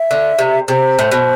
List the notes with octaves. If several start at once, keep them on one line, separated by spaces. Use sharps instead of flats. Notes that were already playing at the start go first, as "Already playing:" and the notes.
Already playing: E5
D3
C3
C3 C5
A2
B2